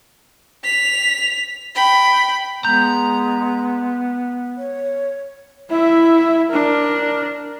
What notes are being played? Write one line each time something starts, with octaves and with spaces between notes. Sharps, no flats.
B6 F7
G5 B5
G#3 B3 A#5 G6
C#5
E4 E5
D4 A#4